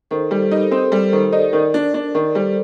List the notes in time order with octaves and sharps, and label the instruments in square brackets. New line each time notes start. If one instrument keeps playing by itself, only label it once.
[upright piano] D#3 [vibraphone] A4 C5
[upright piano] G3 [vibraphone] A4 C5
[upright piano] D#4 [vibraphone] G4 A#4
[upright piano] C4 [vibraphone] A4 C5
[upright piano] G3 [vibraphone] A4 C5
[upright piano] D#3 [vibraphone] A4 C5
[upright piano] D#4 [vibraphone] A#4 D5
[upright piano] D#3
D4
D4
D#3
[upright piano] G3 [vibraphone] A4 C5